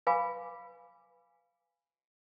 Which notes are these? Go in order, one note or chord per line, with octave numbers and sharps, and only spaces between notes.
B4 F5 G#5 B5 C#6 D6